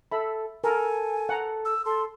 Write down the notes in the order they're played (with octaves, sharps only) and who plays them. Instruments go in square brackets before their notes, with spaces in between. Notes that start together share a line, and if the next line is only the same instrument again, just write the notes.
[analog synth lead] A4 [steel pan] E5 B5
[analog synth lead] A4 [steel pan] A#4 [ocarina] G#5
[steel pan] F#5 A#5
[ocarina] E6
[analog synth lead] A4 [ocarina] C6